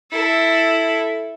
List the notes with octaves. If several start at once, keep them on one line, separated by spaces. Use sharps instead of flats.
E4 A4